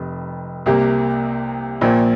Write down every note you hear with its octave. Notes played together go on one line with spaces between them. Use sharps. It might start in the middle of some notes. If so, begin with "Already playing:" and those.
Already playing: F1 F2 C3
C2 C3 A#3 G4
A#1 A#2 F3 A#3